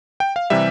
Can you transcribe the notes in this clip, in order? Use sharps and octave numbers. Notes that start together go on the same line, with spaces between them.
G5
F5
C3 E3 G3 E5